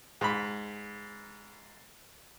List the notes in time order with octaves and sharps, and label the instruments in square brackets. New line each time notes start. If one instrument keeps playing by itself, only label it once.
[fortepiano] G#2 B5